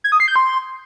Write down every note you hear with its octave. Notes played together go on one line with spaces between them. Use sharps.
G#6
D#6
C7
G6
C6